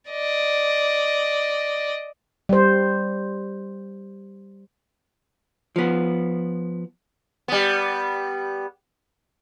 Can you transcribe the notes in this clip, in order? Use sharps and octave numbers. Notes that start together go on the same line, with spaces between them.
D5 D#5
G3 C5
F3 B3
G3 B3